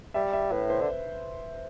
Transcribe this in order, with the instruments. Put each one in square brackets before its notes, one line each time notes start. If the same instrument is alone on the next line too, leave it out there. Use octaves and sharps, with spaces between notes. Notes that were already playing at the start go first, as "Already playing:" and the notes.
[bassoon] G3 [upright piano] E5
[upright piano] E5
[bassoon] A2 [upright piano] B4
[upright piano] C5
[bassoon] D3